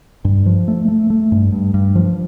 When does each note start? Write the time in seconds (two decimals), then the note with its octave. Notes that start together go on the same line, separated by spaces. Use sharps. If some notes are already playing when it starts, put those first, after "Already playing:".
0.25 G2
0.46 F3
0.68 A3
0.88 A3
1.10 A3
1.32 G2
1.52 G2
1.74 G2
1.96 F3